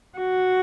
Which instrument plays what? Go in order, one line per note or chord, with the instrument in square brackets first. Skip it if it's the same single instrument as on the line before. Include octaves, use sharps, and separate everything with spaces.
[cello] F#4